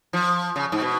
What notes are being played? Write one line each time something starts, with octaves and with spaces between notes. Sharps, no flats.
F3
C#3
G#2
B2